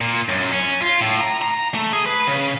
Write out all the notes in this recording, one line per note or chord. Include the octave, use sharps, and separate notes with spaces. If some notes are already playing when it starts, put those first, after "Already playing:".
A#2
F#2
C#4
F4
A2
A#5
A#5
A3
G#4
B4
C#3